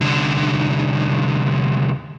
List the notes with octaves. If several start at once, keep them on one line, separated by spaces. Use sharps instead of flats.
C2 D3